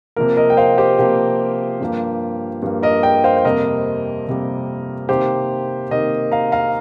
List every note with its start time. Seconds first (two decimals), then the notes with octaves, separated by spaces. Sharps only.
0.16 C3 F3 A#3 A#4
0.37 A#4 D#5
0.50 G5
0.57 C5 F5
0.78 G4 C5
0.99 C3 F3 A#3 G4
1.81 G2 F3 A#3
2.62 G2 F3 A#3
2.83 A#4 D#5
3.03 D#5 G5
3.24 C5 F5
3.37 C5
3.45 F2 C3 G3 A#3 A#4 D#5
4.27 F2 C3 G3 A#3
5.09 C3 D#3 A#3 G4 C5
5.91 C3 D#3 A#3 A#4 D#5
6.32 F5 A#5
6.52 F5 A#5